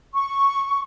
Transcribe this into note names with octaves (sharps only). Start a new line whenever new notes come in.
C#6